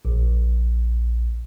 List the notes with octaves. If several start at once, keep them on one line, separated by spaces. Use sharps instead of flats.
A#1